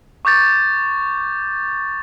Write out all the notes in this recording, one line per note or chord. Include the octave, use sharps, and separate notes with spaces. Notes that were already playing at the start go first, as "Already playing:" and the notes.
C#6 D6 G6 A6